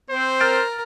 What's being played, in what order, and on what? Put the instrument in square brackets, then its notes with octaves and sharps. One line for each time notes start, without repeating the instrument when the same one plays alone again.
[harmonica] C4 [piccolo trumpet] C5
[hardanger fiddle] A#4 [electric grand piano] F6 A6 D7